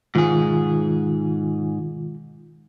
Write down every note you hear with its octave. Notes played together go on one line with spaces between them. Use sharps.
G#2 B2 D#3 F4 G#4